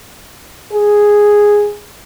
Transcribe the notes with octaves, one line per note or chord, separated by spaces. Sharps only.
G#4